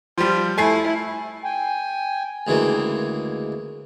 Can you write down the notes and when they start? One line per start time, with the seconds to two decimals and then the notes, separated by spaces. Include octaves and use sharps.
0.18 F3 G3 F4
0.58 A3 E4 G#5 C7
1.44 G5 G#5
2.47 D2 C#3 E3 G#3 A#3